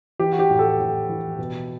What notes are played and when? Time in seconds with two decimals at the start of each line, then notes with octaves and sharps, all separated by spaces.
0.19 E3 G4
0.32 F#4
0.39 G4
0.50 A2
0.59 A4
0.79 A2
1.09 E3
1.38 B2